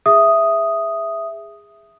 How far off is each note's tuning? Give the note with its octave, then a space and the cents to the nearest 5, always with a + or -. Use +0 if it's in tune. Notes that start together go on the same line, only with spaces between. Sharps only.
G#4 -20 E5 +0 D#6 +0